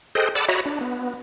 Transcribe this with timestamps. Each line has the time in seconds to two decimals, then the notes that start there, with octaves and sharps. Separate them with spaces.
0.15 G#4 A4 C5 D#5 G5 F#6
0.35 D5 F#5 A5 B5 D6 E6
0.49 F#4 C#5 D#5 E5 A#5 B5
0.66 D4
0.81 B3